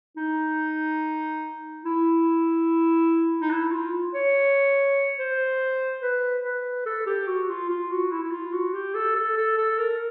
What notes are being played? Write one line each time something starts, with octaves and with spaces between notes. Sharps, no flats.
D#4
E4
D#4
E4
F4
C#5
C5
B4
B4
A4
G4
F#4
F4
F4
F#4
E4
E4
F4
F#4
G4
A4
A4
A4
A4
A#4